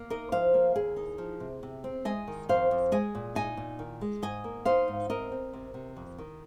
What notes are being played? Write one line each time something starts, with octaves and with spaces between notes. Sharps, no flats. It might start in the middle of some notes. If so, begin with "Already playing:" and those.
Already playing: A#3
D#4 A#4 D#5
F3 C5 F5
A#3
D#2 G#4
D#4
F3
C3
C3
C4
G#3 D#5 G#5
D#3
F2 C5 F5
F2
G#3 D#5 G#5
A#2
D#4 D#5 G#5
A#2
D#3
G#3
G#2 D#5 G#5
A#3
D#4 C5 F5
G#2
C4 A#4 D#5
C4
C3
C3
F2
D#3